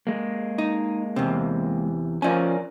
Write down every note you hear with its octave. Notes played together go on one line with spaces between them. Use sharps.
G#3 A#3
D#4
E2 C3
F3 C#4 A#4 D5 G#5